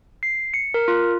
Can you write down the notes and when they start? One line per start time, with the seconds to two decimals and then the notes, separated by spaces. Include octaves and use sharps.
0.23 C7
0.54 C#7
0.74 A#4
0.88 F4